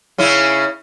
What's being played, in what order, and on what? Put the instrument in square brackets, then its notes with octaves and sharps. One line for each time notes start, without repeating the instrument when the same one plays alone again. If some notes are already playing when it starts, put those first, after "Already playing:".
[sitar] C#3 C#4 E4